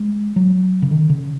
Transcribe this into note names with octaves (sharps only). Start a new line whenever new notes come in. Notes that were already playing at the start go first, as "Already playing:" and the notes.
Already playing: G#3
F#3
C#3
D#3
C#3